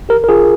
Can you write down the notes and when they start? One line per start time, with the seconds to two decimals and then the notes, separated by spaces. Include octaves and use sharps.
0.09 G4 A#4
0.24 A#4
0.29 F4 G#4